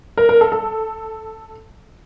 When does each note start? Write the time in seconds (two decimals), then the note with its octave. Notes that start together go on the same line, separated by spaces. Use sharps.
0.17 A#4
0.29 A#4
0.41 A4
0.52 A4